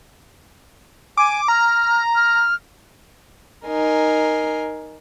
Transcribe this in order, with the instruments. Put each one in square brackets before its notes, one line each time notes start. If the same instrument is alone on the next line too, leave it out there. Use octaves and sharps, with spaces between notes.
[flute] G#5 [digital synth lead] D6
[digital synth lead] A#5 [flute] F6
[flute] F6
[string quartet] D#4 A#4 G#5 C6